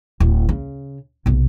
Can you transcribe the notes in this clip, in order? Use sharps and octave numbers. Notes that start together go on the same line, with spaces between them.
D1
C#3
B1 C3